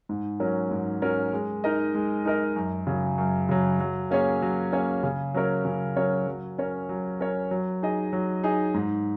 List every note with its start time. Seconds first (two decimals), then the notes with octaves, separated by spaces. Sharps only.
0.09 G#2
0.40 F#3 C#4 A#4 C#5
0.71 G#2
1.02 F#3 C#4 A#4 C#5
1.33 G#3
1.64 D#4 A#4 D#5
1.95 G#3
2.25 D#4 A#4 D#5
2.56 F#2
2.87 C#3 F#3
3.18 F#2
3.49 C#3 F#3
3.80 F#3
4.11 A#3 C#4 G#4 C#5
4.42 F#3
4.73 A#3 C#4 G#4 C#5
5.03 C#3
5.34 F#3 C#4 A#4 C#5
5.65 C#3
5.96 F#3 C#4 A#4 C#5
6.27 F#3
6.58 C#4 A#4 C#5
6.89 F#3
7.20 C#4 A#4 C#5
7.51 F#3
7.82 D#4 G#4 D#5
8.13 F#3
8.43 D#4 G#4 D#5
8.74 G#2